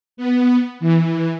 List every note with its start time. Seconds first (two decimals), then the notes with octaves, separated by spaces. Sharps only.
0.17 B3
0.80 E3